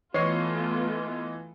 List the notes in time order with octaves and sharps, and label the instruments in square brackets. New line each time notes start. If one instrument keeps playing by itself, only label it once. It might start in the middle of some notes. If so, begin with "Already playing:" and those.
[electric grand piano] E3 D#5 C7 [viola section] A3 B3 F4 [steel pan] C#5